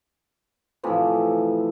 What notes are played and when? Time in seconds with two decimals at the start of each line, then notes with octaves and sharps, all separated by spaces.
0.83 A2 C3 E3 F3